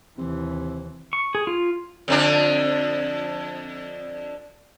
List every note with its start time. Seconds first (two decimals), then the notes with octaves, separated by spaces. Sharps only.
0.18 D#2 C3 E3
1.13 C#6
1.35 G#4
1.47 F4
2.08 F2 D3 D4